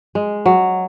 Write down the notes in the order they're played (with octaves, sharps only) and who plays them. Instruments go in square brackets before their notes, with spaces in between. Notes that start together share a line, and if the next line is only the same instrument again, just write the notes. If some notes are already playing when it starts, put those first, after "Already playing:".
[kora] G#3
F#3